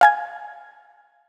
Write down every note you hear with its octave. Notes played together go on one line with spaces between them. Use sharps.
F5 G#5 G#6